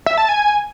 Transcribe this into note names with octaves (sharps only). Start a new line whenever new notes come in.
E5
A5
G#5